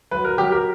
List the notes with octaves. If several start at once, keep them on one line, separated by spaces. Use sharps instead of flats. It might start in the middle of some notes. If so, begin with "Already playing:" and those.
F#3 B4
A#4
F#3 G4
A#4